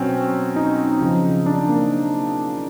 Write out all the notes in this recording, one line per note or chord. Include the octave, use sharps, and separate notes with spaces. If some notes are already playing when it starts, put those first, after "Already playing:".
Already playing: B2 F#3 C4 C#4
D#4
C#3 F3
D4
A#3